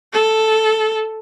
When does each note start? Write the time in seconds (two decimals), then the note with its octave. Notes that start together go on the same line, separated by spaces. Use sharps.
0.13 A4